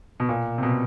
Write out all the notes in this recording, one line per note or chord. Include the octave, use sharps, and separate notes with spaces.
B2
A#2
C3
B2